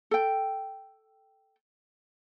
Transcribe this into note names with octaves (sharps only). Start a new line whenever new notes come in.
A4 G5